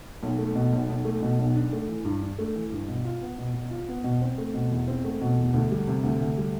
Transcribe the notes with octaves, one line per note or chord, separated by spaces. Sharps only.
B1
A3
B2
B1
B1
A3
B2
B1
D4
A3
E3
G2
D4
A3
E3
G2
B2
F4
B3
B2
B2
F4
B3
B2
C4
A3
B2
E2
C4
A3
B2
E2
D2
G3
C3
D2
D2
G3